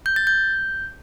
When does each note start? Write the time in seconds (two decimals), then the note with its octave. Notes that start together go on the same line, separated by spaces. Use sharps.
0.06 G6
0.16 A6
0.27 G6